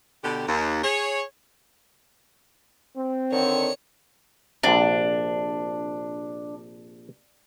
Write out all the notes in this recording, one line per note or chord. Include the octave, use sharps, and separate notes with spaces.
B2 D3 G4
D#2
G#4 C#5
C4
D3 D#3 C#5 C#7
A#1 C3 D4